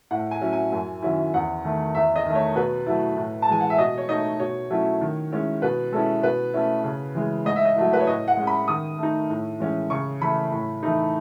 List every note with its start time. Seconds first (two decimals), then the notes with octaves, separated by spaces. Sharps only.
0.11 A2 F#5
0.31 G#5
0.42 F#3 C#4 E4
0.53 G#5
0.72 F#2
1.02 D#3 F#3 C#4 E4
1.34 E2 F#5
1.65 D#3 A3
1.95 E2 E5
2.16 D#5
2.26 D#3 A3
2.35 C#5
2.56 B2 B4
2.86 F#3 A3 E4
3.17 A2
3.42 A5
3.48 E3 G#3 G#5
3.61 F#5
3.70 E5
3.78 B2 D#5
3.98 C#5
4.09 A3 D#4 D#5
4.40 B2 C#5
4.71 F#3 A3 C#4 E4
5.01 D#3
5.32 G#3 C#4 E4
5.62 B2 B4
5.92 G#3 C#4 E4 A4
6.23 B2 B4
6.54 A3 C#4 E4
6.84 C#3
7.15 E3 G#3
7.45 G#2 D#5
7.56 E5
7.65 D#5
7.76 F#3 A3 E4
7.93 B4
8.01 C#5
8.07 A2 D#5
8.28 F#5
8.37 G#3 C#4
8.47 B5
8.68 D#3 D#6
8.98 A3 D#4
9.30 A2
9.60 E3 G#3 C#4
9.90 C#3 C#6
10.21 E3 A3 E4 B5
10.52 A2
10.83 E3 A3 D#4